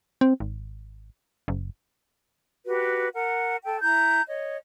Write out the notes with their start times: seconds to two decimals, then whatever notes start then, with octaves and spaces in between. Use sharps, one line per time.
0.21 C4
0.40 G#1
1.48 F#1
2.65 F#4 G4 B4
3.14 A#4 F#5
3.64 A4 G5
3.81 E4 A#5 G6
4.26 C#5 D#5